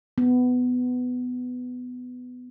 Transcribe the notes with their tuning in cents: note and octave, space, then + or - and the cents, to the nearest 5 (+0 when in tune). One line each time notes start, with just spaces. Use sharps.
B3 +15